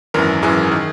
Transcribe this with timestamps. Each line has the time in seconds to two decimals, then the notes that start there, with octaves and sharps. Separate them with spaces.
0.14 G#1 F#2 E3 A#4
0.42 G#1 F#2 E3 G#4
0.72 D#3